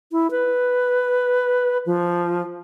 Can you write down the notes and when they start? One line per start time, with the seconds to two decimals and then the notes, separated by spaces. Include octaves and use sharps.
0.12 E4
0.31 B4
1.86 F3